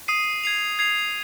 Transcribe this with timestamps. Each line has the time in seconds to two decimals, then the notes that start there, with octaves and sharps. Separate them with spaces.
0.08 D#6 C7 D#7
0.44 G#6 C7 F7
0.79 G#6 C7 F7